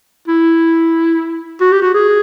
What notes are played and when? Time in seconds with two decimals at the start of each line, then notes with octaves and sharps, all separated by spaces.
0.28 E4
1.61 F#4
1.72 G4
1.82 F#4
1.94 G#4